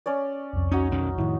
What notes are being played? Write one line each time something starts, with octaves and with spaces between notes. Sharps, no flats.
C#4 C#5 D5
C2 F2
C#4 D#4 F#4
B1 D#3 C#4
F2 A2 D#3 E4